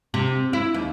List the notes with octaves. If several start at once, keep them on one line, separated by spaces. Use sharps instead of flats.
C3
E4
D#2